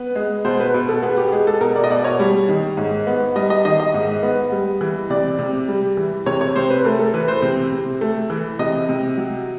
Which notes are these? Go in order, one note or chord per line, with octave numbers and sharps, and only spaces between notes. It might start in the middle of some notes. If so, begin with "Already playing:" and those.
Already playing: B3 B4
G#3
B2 C5
B4
B2
A4
B3 G#4
G4
G#3 G#4
A4
B2 A#4
D5
D#5
B2 D5
C#5
G3
D#3
G#2
B3
G3 D#5
D#5
D#3 D#5
D#5
G#2
B3
G3
E3
C3 D5
C3
G3
E3
C3 C#5
C#5
C3 C5
B4
A3 A#4
A4
E3 B4
C5
C3
C3
A3
E3
C3 D#5
C3
F#3